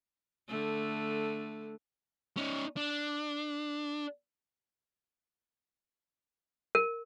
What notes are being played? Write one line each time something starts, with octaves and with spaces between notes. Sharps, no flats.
D3 A3
C#4 D#4
D4
A#4